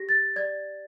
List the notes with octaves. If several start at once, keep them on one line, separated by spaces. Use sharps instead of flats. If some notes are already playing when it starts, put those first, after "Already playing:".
Already playing: G4 A#6
A6
D5 G#6